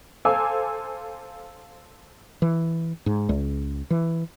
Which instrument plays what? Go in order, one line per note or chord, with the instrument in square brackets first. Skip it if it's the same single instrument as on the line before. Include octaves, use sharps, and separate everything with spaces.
[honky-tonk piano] A4 C5 F5 G#5 D6 E6
[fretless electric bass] E3
G#2
C#2
E3